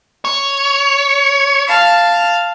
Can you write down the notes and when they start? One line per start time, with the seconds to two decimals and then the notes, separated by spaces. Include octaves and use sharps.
0.25 C#5
1.68 F5 A5